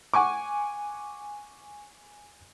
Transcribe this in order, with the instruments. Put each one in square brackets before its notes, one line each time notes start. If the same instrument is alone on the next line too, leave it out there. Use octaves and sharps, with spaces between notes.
[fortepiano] F#5 G#5 C#6 D6